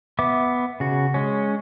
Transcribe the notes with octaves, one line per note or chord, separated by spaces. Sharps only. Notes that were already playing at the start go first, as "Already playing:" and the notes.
B3 E5 D6
C#3 F#4
G#3 C#4